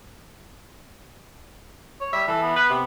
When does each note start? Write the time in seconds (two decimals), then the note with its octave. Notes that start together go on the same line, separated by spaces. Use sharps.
2.01 C#5
2.13 G3 E5
2.28 E3 A4
2.42 B3
2.56 B4
2.70 C3